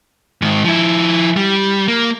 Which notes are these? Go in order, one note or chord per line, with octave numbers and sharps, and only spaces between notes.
G#2 D#3
F3 E4
G3
A#3